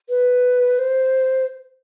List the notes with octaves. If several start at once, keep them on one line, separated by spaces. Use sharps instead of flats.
B4
C5